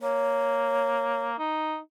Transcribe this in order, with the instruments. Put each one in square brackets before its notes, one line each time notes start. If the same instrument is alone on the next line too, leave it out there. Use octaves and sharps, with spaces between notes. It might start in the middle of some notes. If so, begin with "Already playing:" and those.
[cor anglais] A#3 [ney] C#5
[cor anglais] D#4